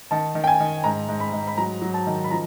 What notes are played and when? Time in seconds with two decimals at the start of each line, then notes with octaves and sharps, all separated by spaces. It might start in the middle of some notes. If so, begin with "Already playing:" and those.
0.11 D#3 A5
0.35 D#3
0.44 G5
0.47 G#5
0.60 D#3
0.84 G#2 A#5
1.09 G#2
1.20 B5
1.33 G#2
1.47 B5
1.57 F#3 A#5
1.82 F#3
1.94 A5
2.07 D#3
2.24 B5
2.31 F3 A#5